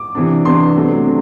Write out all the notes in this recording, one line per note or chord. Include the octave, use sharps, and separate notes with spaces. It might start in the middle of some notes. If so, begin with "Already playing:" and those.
Already playing: D6
C3 E3 B3 D4
C3 E3 B3 D4 C6
C3 F#3 A3 D4
C3